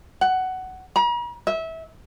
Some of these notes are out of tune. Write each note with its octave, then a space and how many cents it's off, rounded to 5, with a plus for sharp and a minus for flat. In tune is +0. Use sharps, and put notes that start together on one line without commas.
F#5 +15
A#5 +45
E5 -25